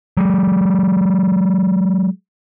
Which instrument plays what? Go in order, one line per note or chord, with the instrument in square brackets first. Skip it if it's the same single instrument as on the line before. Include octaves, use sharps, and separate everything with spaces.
[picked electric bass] F#3 G#3